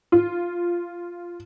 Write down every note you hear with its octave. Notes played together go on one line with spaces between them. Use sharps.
F4